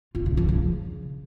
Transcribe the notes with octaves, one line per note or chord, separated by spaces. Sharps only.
F4
C#3
F3
C#3